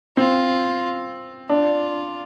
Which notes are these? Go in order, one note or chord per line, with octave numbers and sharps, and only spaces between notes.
C4 F4
D4 F4